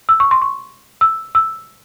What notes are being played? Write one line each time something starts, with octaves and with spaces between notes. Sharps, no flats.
E6
C#6
C6
C#6
E6
E6